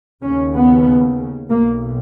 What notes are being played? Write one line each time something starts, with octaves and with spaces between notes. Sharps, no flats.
D#2 C#3 C#4
B3
B1 B2 A#3